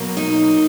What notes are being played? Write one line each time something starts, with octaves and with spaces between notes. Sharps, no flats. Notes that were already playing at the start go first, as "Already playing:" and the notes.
Already playing: B2 F#3 A#3
D#4